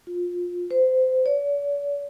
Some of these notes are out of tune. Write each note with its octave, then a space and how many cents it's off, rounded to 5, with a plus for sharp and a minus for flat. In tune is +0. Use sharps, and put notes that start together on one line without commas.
F4 +20
C5 -25
D5 -45